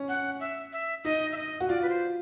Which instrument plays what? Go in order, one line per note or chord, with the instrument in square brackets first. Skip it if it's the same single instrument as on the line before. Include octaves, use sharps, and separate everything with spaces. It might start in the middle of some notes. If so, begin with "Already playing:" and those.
Already playing: [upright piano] C#4
[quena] F#5
E5
E5
[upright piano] D#4 [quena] D#5
[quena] E5
D#5
[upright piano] F#4
[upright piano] F4 [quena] D5
[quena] B4
C5